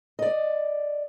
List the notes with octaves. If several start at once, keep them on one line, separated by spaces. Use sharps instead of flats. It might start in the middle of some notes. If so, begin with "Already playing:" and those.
D5 D#5